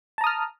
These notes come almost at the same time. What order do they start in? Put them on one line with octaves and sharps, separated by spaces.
A5 A#5 D#6 F6